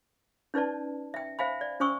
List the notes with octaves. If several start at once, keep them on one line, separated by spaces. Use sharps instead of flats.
C#4 D#4 B4 D5 A5
E5 G5
C5 E5 F5 G#5 B5
D5
C#4 C5 G#5 C#6 D#6 E6